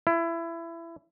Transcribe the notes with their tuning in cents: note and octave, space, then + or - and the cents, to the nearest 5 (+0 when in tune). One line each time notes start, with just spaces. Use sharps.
E4 +20